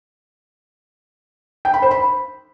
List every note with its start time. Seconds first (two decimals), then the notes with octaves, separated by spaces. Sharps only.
1.65 G5
1.74 B5
1.82 C5
1.91 B5